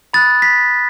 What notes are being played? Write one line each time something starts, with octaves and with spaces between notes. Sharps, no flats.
B5 D#6 F#6 A6
B6